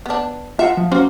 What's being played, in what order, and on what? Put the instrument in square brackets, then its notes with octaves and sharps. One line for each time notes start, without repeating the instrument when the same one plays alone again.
[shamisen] B3 D4
[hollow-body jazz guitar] F4 F#5 [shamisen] E5
[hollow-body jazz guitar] F3
[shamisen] A#3 F#4 C5 [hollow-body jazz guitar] C#4